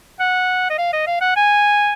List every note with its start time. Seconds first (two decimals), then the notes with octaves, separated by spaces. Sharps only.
0.20 F#5
0.70 D#5
0.78 F5
0.93 D#5
1.07 F5
1.21 F#5
1.36 G#5